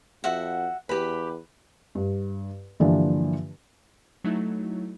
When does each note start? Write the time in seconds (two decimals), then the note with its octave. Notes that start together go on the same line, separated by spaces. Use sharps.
0.24 F2 F#4 E5 F#5
0.89 E2 G4 B4 B5
1.95 G2
2.80 G2 D3 E3 F3 A#3 D4
4.24 F#3 A3 D#4 E4